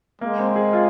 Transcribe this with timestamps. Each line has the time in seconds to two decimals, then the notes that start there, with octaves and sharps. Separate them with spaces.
0.21 G#3 A#3
0.39 C4
0.56 G#4
0.73 F4